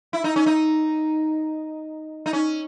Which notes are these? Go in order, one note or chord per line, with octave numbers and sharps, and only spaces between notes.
E4
D#4
C#4
D#4
D#4
C#4